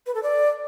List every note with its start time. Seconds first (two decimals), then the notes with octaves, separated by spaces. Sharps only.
0.06 B4
0.15 A4
0.23 D5